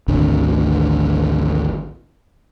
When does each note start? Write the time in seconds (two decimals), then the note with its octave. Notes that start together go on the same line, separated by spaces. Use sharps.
0.08 G#1 D2 D3